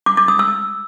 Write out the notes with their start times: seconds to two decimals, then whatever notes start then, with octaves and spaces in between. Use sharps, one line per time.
0.06 D6
0.17 D6
0.28 D#6
0.39 E6